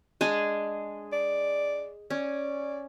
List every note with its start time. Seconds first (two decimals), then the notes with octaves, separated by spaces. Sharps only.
0.21 G#3 D4 G#4
1.12 D5
2.10 C#4 D5